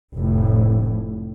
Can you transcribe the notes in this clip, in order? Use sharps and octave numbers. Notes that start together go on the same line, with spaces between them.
F1 A2